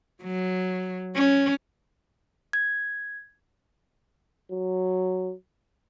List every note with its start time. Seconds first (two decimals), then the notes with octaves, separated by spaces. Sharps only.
0.23 F#3
1.15 C#4
2.53 G#6
4.51 F#3